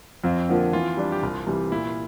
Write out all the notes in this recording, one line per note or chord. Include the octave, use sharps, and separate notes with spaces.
F2 C4
D3 F3 A#3
E3 F4
G3 D4
G4
C2 F4
C3 E3 G3
A#2 E4